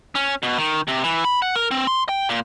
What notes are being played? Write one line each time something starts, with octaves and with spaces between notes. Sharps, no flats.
C#4
B2
D#3
C3
E3
B5
F#5
A#4
C4
C6
G5
A#2